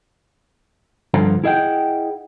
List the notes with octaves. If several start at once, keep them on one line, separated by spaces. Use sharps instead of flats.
G2 D3 F3
E4 G#4 D#5 F#5 G5